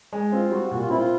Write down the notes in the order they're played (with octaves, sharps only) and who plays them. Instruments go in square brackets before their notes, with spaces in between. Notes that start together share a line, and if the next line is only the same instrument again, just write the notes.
[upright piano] G#3
[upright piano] C4 [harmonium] F4
[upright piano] G3 [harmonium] F#4
[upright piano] A#2 [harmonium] F#4
[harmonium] F4
[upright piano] C4 [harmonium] E4
[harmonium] F4